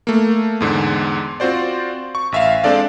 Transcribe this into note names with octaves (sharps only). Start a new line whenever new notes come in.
A3 A#3
E2 G#2 D3
C4 F4 F#4 C5 D5
C#6
A1 E5 F5
G#3 C4 D4 A4 D5 F5